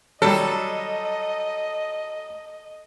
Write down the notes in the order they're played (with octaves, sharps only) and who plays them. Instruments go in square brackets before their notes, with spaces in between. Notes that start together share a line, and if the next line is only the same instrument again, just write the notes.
[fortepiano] F#3 G3 [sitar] A4 [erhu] D#5